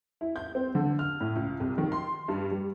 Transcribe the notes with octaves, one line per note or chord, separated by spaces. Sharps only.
E4
G6
C4
D3
F6
A2
C#2
C2
D#3
C6
G2
G3